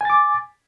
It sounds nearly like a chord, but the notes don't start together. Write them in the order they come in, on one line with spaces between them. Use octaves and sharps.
G#5 A6 D6